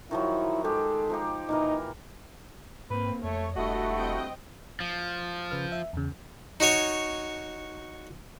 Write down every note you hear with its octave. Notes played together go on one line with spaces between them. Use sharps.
D#3 F3 F#3 E4
G#3 G4 A4
F3 D#4 G4
A#2 E3 D#4 A#4
G#2 A#3 C4 B4
F2 A3 C#5
E1 G2 A3 E4 F#4 D#5
C4 D#5 G5
F3
C#3 B4 F6
E5
E2 C#3
D#4 F#4 C#5 G#5